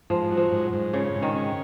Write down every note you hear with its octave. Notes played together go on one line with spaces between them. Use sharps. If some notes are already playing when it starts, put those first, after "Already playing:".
G#2 F3
F#3
F3
G#2
G#2
C#3 C#4
G#2
D#3
C#4